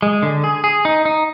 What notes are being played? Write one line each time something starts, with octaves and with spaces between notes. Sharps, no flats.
G#3
D3
G#4
G#4
D#4
D#4